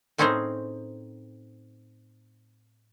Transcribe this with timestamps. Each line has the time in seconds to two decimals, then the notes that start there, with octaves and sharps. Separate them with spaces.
0.18 A2 C4 C#4 D#4 G#4 C5